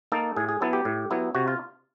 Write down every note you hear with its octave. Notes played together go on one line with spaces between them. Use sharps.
A#3 D#4 A4
A2 G#4
G#4
F#3 B3 E4 A4
G4
A2
F#3 B3 E4
C3 F#4
F4